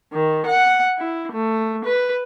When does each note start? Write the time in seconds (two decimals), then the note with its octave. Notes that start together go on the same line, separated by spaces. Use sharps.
0.12 D#3
0.46 F#5
0.98 E4
1.32 A3
1.85 B4